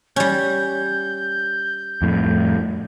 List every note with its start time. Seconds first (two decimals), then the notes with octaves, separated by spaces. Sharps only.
0.16 G3 C#4 G6
2.02 F2 A2